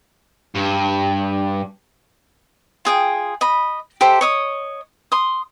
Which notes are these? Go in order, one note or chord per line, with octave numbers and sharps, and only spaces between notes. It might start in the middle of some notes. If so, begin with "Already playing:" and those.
G2
F4 G#4 G5
D#5 B5
G4 A4 C5 E5
C#5 D#5 D#6
C6 D#6